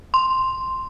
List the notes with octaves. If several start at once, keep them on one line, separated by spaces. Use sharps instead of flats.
C6